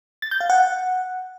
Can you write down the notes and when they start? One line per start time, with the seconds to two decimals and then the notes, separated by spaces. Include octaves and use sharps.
0.22 A6
0.31 G6
0.40 F5
0.50 F#5